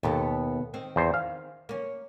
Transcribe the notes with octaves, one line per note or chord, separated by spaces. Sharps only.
D#2 B2 B3 A4
D#3 C4
E2 C5
F5
A#3 C#4